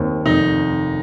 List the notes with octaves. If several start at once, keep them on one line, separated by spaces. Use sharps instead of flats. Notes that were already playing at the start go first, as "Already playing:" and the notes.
Already playing: D#2 C4
F1 D#4